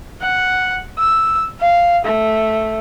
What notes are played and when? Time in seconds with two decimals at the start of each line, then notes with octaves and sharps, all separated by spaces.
0.22 F#5
0.99 E6
1.60 F5
2.05 A3